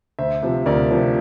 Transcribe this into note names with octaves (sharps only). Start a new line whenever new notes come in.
D2 C5 E5
C3 F3
D2 A#4 D5
C3 F3